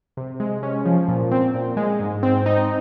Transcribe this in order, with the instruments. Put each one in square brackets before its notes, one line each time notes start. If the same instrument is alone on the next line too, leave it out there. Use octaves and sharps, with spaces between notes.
[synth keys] C3
G#3
C#4
F3
A#2
C4
A#2
G#3
G#2
C4
D#4